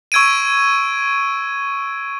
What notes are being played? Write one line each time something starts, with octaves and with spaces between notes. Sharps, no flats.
C#6 E6 G#6 D7 D#7